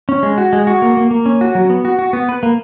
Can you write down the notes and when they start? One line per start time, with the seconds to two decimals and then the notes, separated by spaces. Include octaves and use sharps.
0.09 C#4
0.23 G#3
0.38 F#4
0.53 G#3
0.67 F#4
0.82 A#3
0.97 A#3
1.11 A#3
1.26 C#4
1.41 F#4
1.55 F#3
1.70 B3
1.85 F#4
1.99 F#4
2.13 B3
2.29 B4
2.43 A#3